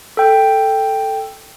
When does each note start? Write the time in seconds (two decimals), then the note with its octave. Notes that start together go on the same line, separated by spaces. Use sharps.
0.17 A4 G5